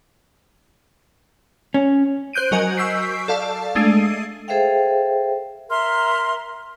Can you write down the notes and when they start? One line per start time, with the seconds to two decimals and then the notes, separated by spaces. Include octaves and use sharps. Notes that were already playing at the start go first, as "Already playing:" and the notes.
1.74 C#4
2.33 C5 F#6 G6 D7 D#7
2.51 F#3 F#4 A#4 D#5 G#5
2.77 C#6 E6 G6 B6 C7 D7
3.28 A4 D5 F5 A5
3.75 G#3 A3 D4 C7 D#7
4.48 G#4 A4 C5 E5 F5 G5
5.70 A#4 E5 C6 F6